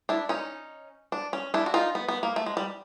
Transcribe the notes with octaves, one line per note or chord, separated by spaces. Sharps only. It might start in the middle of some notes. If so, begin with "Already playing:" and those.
D4 E4
C#4 D#4
D4
C#4
D4 E4
F#4
D#4 F4
B3
B3
A#3
A3
G#3
G3